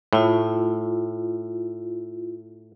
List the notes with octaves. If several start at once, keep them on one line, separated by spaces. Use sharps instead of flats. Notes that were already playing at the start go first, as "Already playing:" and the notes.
A2 E4 F4